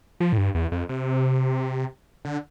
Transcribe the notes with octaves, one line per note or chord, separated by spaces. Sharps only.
F3
A2
G2
E2
F2
C3
D3